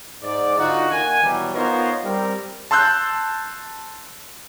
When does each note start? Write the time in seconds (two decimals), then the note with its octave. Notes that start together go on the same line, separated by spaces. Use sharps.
0.22 G#2 D5
0.58 D3 D#4 F4 F#4
0.91 D#2 D#3 F#5 G#5
1.23 B2 E3 F#3 G3
1.54 B3 D#4 F4 A#4 C5 C#5
2.04 G3 C4 A#4
2.71 A5 C6 E6 F#6 G6